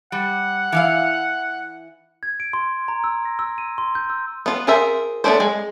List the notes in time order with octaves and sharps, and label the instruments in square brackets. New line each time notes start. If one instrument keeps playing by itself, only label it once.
[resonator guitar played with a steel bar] G3 [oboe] F#5
[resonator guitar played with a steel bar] E3 E4 F5
[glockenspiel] G#6
D7
C6
A#5
E6
A#6
E6
D#7
C6
G6
E6
[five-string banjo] B3 F4
F4 G#4 A#4 C5 E5
A3 B3 C#4 D4 C5
G#3